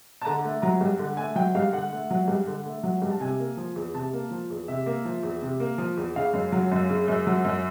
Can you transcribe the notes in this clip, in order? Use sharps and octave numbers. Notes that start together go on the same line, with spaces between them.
A5
D3 A#5
A3
F#3 A#5
G2
D3
A3 G#5
F#3 G5
G2 F5
D3 F#5
A3
F#3
G2
D3
A3
F#3
G2
A5
C3 G#5
A#3
F3
E2
C3 A5
A#3
F3
E2
C3 E5
A#3
F3
E2
C3
A#3
F3
E2
C#3 F5
F#2
F#3
F#2
C#3
F#2
F#3
F#2